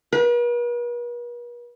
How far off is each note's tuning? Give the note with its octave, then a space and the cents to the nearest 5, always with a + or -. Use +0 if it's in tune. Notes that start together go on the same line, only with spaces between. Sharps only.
B4 -45